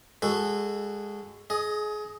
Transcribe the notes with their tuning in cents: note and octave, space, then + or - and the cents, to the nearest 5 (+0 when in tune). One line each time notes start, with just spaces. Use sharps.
G#3 -20 F#4 +0 A4 +0
G#4 +25 D#5 +0